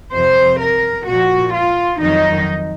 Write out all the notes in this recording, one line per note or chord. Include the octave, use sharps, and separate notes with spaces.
F2 C3 F3 C5
A#4
A#2 F3 F#4
F4
F2 D#3 F#3 D#4